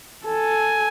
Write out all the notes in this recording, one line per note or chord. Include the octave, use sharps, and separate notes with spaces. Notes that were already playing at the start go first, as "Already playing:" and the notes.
A4 G#5